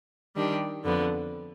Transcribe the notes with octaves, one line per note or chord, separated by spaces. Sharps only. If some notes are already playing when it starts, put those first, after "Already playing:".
D#3 G3 D4 G4
F2 D3 F3 B3